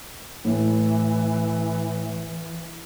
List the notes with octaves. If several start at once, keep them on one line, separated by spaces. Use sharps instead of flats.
A2 E3